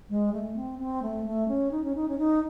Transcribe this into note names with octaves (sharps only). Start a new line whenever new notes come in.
G#3
A3
C4
C4
A3
A3
C#4
D#4
C#4
D#4
C#4
D#4